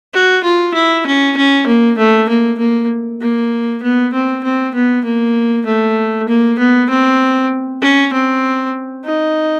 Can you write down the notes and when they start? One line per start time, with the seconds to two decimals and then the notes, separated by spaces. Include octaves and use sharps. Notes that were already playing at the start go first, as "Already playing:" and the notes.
0.14 F#4
0.44 F4
0.74 E4
1.06 C#4
1.37 C#4
1.67 A#3
1.98 A3
2.29 A#3
2.59 A#3
3.21 A#3
3.83 B3
4.13 C4
4.44 C4
4.75 B3
5.05 A#3
5.66 A3
6.28 A#3
6.59 B3
6.90 C4
7.82 C#4
8.13 C4
9.05 D#4